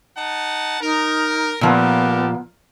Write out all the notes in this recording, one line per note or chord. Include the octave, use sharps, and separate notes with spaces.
D#4 F#5 A5
D#4 A#4
A#2 F3 B3 G4 A4 A#4